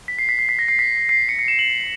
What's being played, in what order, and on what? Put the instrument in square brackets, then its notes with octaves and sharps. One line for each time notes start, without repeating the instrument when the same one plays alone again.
[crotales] B6
C7
B6
C7
B6
A#6
C7
B6
C7
C#7
C#7
E7
F#7